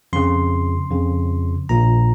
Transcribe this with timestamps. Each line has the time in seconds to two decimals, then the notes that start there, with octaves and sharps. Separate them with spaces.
0.13 F2 C#3 C6
0.91 F2 C#3
1.69 A#1 A#2 A#5